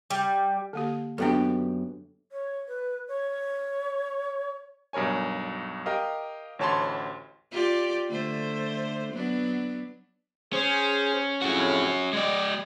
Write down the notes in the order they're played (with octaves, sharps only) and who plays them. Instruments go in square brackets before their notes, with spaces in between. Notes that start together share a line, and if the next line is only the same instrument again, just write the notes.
[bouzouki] G3
[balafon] D3 A#3 G4
[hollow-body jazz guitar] F#2 B3 G4 [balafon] D4 A4
[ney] C#5
B4
C#5
[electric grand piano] B1 G2 A#4 C#5 G#5
G4 A#4 D#5 F5
A1 D2 C#5 A5 B5 C6
[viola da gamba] F4 G4 D5
D3 A3 C5
F#3 B3 D4
[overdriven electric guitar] C#4 [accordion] G#4 C5
[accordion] F2 A2 C#3 [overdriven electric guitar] C#4 F#4
[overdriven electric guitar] G#3 D5 [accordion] D#5